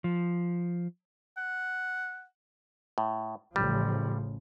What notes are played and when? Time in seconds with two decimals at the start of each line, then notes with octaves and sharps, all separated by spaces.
0.04 F3
1.37 F#5
2.98 A2
3.56 A1 C#3 F3 G3